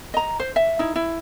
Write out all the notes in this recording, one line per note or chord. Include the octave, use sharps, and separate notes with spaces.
D#5 A#5
C5
E5
D#4 E4
E4